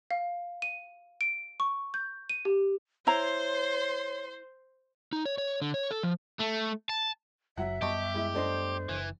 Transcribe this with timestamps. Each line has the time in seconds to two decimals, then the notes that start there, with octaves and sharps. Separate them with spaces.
0.11 F5
0.62 D#7
1.21 D7
1.60 C#6
1.94 G6
2.29 D#7
2.45 G4
3.07 E4 C5 C#5 A#5 C6
5.13 D#4
5.25 C#5
5.38 C#5
5.62 D3
5.74 C#5
5.91 A4
6.03 F3
6.39 A3
6.89 A5
7.57 F#1 F#3 E5 F#5
7.82 F#2 G3 B3 G4 D#5 A5 C#6
8.14 G#3 E4
8.35 A3 D4 C5 D#5
8.89 F#1 E3